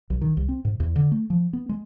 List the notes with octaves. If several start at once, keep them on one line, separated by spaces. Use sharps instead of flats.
B1
D#3
C2
C4
G#2
E2
D3
A3
F3
B3
G#3